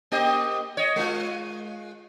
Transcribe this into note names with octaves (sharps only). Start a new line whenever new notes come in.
A#3 G4 D#5
C#5 D#5
G#3 F4